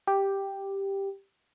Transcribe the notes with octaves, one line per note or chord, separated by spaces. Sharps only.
G4